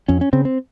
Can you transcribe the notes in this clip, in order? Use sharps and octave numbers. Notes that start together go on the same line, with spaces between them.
F2 C#4
C#4
C#3 C4
C4